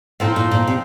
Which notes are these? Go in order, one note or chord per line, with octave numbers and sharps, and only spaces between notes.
A2 F3 C4 D#4
A#2
A#2
C3